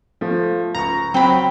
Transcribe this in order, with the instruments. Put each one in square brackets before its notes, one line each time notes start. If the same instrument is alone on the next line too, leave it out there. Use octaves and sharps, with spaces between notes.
[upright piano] F3 A3
[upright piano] C#2 C#6 [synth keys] A#5
[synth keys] F#3 C4 [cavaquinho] G5 B5